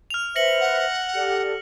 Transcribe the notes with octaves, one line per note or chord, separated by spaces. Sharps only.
F6 F7
B4 C5 E5 A#6 C#7 F#7
F#5
G4 A4 D5